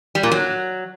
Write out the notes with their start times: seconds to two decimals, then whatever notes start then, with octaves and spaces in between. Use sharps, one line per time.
0.15 G3
0.23 A#2
0.32 F#3